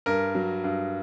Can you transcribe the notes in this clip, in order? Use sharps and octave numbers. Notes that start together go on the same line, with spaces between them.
G2 A#4
F#3
G2